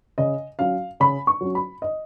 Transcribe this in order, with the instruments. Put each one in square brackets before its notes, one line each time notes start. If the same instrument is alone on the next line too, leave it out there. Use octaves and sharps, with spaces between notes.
[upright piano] C#3 D#5
F#3 C#4 F5
C#3 B5
C#6
F#3 C#4
B5
D#5